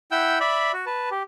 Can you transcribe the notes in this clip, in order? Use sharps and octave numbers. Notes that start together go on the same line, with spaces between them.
E4 F#5 G5 E6 G6
D5 E5 B5
F#4
B4 A5
G4